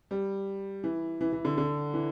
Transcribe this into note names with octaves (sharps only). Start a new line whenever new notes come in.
G3
E3
E3
E3
D3
D3
E3